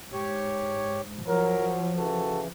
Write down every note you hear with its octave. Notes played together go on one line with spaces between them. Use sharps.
G#2 G4 C#5
F3 F#3 A#4
C#3 E3 F#4 A4